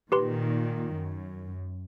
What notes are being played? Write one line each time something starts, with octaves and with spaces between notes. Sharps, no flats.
A#2 D#3 G4 B4 C6
F#2